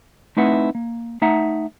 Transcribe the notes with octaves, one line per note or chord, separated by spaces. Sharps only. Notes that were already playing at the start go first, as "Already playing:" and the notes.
A3 C4 D#4 E4 B4 F#5
A#3
A3 D#4 E5 F#5 A#5